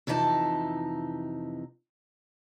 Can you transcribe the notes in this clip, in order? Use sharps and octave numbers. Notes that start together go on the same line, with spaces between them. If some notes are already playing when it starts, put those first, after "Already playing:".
F2 C3 E3 D#4 G#5 A5